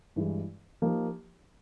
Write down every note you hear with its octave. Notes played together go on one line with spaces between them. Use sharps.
G2 E3 G#3
F3 A#3 D#4 G4